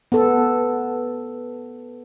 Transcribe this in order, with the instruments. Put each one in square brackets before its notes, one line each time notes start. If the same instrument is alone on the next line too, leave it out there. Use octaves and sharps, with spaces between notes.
[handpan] B3 A4